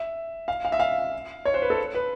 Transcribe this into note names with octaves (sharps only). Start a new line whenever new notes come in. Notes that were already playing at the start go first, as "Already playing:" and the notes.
Already playing: E5
F5
F5
E5
F5
C#5
C5
B4
A4
B4